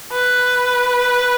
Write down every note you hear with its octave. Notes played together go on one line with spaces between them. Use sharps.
B4